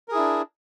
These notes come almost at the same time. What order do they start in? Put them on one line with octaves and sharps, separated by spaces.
A#4 G#4 E4 D4